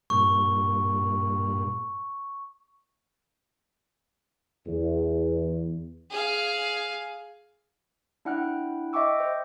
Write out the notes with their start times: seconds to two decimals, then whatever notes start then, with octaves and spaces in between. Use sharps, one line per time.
0.10 G2 A#2 C#6
4.67 E2
6.11 G#4 F5
8.25 D4 E4 F#5 G5 F6 F#6
8.93 D#5 E5 G5 C#6 D6 E6
9.20 C5